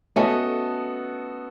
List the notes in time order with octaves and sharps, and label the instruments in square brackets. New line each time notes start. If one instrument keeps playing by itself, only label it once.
[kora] A3 C#4 [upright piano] B3 F#4 A4 D#5